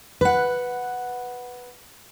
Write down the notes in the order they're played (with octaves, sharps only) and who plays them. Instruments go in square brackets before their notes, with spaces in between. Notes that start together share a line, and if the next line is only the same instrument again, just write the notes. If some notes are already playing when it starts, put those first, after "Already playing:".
[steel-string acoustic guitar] B4 F#5